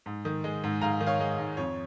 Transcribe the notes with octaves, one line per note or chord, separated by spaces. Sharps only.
G#2
D#3
G#3
G#2
G#2 F5 A#5
D#3
C#5 F5
G#3
G#2
F2 C#5